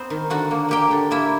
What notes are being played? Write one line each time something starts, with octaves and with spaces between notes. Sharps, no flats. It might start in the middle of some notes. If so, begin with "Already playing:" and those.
Already playing: B3 C4 C5
D#3
D3 F#4 F#5
A#3
A#3 G4 G5
D3
A#3 E4 E5